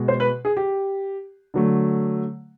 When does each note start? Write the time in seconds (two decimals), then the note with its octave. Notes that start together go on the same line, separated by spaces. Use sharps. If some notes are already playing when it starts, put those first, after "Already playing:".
Already playing: B2 G#3
0.08 C5
0.20 B4
0.45 G#4
0.57 G4
1.54 D3 F#3 A3